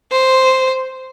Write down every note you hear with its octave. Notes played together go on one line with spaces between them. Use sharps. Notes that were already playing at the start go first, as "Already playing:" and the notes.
C5